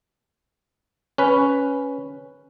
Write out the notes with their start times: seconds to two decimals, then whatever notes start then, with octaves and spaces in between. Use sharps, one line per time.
1.18 C#4 B4